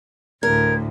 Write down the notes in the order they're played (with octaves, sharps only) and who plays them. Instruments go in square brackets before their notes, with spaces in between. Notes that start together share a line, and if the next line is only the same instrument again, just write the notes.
[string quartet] D2 A2 [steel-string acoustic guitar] A#4 [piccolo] G#6